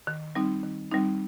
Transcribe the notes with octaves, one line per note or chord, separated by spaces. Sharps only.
D#3
G3 C4 D#4
D#3
G3 C4 D#4